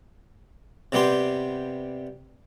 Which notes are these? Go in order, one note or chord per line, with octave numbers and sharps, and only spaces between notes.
C3 G3 B3 G4 C6